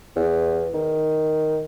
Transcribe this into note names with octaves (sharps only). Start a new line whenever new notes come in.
E2
D#3